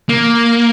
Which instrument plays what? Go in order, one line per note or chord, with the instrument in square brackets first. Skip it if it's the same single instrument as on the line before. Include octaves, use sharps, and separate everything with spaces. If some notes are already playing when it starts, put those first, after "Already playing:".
[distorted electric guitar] A#3